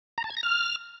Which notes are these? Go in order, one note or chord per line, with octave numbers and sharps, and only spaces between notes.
A#5
A5
G#6
A#6
F6